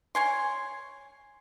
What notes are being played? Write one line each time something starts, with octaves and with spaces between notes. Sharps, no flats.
C#5 G#5 C6